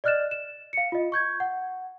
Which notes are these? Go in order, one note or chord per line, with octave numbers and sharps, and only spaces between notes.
D5 D#5 F6 F#6 A6 E7
E7
F5 C#7
F4 D#5
C#6 G6 G#6
F#5